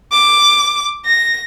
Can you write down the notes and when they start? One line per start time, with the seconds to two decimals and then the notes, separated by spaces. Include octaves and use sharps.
0.12 D6
1.06 A#6